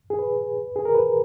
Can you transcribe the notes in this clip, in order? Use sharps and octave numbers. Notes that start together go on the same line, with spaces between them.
G#4
B4
G#4
A#4
B4